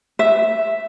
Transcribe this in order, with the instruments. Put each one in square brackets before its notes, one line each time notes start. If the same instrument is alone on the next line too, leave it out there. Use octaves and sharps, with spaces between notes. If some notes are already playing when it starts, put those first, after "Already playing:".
[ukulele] E5